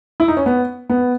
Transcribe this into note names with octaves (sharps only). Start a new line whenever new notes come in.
E4
D#4
C#4
B3
B3